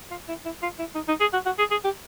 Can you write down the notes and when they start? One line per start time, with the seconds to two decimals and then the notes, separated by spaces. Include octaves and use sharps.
0.10 F4
0.29 E4
0.45 E4
0.62 F4
0.79 E4
0.95 D#4
1.08 D#4
1.20 G#4
1.33 F#4
1.46 F#4
1.58 G#4
1.71 G#4
1.84 G4